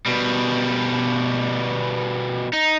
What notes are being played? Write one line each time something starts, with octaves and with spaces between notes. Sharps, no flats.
B2 G3
D#4